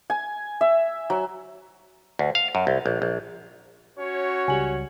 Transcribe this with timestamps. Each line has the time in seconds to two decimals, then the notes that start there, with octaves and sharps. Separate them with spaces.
0.10 G#5
0.61 E5
1.10 F#3
2.19 D2
2.35 F5
2.55 F#2
2.67 C2
2.86 A#1
3.02 A#1
3.98 C#4 F#4 C#5
4.48 C#2 G3 G#5 F#7